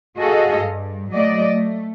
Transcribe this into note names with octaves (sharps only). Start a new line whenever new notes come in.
F#4 G#4 A4 D#5 F5
G2
F#3 A3 D5 D#5
A3